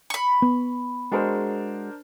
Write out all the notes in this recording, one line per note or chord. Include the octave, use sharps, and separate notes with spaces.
B5 C#6
B3
G#3 D4 F#4 G#4 A#4 C5